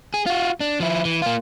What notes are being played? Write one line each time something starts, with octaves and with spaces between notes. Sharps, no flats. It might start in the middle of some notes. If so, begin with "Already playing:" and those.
G#4
F4 F#4
D4
F3 E4
E3
A#3 F4